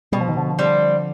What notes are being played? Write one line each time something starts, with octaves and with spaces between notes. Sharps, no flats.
B2 G3
F3
D#3
D3 F3
G3 C4